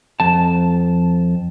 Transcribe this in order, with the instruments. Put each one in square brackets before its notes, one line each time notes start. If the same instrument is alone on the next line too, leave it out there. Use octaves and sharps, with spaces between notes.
[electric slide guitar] F2 A5